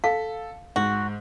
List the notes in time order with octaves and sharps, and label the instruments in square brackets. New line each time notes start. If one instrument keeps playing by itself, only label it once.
[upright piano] A4 [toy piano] F5
[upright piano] G#2 [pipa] F#4